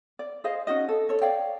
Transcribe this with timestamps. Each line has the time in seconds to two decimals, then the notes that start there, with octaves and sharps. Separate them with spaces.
0.19 D5
0.44 G#4 C5 D#5 F5
0.67 C#4 D#4 F#4 D#5
0.89 A4
1.09 A4 C#5
1.22 C#5 D5 F5 G5